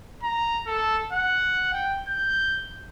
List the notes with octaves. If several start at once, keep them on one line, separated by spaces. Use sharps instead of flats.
A#5
A4
F#5
G5
G6